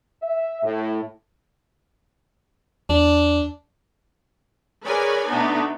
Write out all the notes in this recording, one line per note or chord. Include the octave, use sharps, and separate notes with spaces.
E5
A2
E2 D4
G#4 A#4 B4 C#5 D5 G#5
B2 A3 B3 D4 D#4